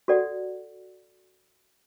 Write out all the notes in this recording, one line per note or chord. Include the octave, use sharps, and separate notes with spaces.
F#4 A4 D5 F#5